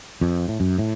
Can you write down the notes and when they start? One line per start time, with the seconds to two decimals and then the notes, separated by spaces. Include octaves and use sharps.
0.21 F2
0.48 A2
0.60 F#2
0.78 A2